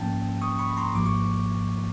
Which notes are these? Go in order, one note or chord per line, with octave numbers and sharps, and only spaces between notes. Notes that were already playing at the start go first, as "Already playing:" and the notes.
Already playing: G#2 F3 A#3 C#4 G5 A5
C#6 D#6
B5 C#6
A#5 C6
G#1 G#2 F3 A#3 D6
C#6